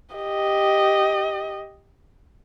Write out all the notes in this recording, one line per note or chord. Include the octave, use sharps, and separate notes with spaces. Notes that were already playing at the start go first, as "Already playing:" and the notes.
G4 D#5